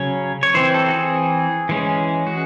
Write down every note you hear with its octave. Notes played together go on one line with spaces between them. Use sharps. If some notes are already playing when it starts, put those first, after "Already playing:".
Already playing: C#3 F#3 C#4 C#5
C#5
E3 C4 C5
A4
F#4
G#4
E3 G#3 C#4
F#4